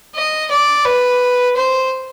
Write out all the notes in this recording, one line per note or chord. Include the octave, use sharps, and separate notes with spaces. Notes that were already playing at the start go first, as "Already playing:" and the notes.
D#5
D5
B4
C5